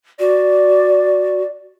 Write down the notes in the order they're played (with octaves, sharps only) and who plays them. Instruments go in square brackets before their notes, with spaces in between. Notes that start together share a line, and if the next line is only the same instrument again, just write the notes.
[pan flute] F#4 [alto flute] D5